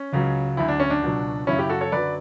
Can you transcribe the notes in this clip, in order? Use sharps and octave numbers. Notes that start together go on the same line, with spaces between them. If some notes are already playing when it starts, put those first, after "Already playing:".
Already playing: C#4
C#2 C#3 F#3
D2 D3 F#3 E4
D4
C#4
D4
C#2 B2 F#3
F#2 C#3 F#3 C#4 E4
E4 G4
F#4 A4
A4 C#5
F#2 D3 F#3 B4 D5